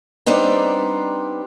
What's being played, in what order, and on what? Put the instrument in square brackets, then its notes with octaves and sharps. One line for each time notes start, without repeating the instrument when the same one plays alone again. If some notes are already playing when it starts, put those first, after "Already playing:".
[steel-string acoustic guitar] G3 B3 C4 D4 D#4